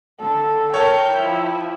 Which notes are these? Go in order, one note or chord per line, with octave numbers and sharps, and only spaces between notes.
D3 A4
A#4 C#5 G5 A5 F6 G6
F3 E4